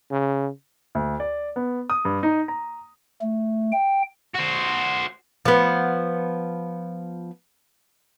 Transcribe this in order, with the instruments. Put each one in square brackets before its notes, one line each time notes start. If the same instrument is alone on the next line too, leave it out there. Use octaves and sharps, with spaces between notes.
[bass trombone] C#3
[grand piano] D2
D5
B3
D#6
G2
D#4
A#5
[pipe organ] A3
G5
[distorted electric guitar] F#4 C5
[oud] F3 B3